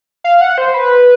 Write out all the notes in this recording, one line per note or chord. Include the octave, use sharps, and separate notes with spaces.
F5
F#5
C5
B4